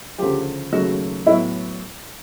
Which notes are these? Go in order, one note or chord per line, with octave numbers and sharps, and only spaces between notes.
D2 C#3 F3 G4
D#2 C#3 F#3 A3 F#4
A2 F#3 B3 E4